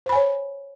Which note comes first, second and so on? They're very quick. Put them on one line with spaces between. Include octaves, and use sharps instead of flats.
C5 B5 G#5 C#5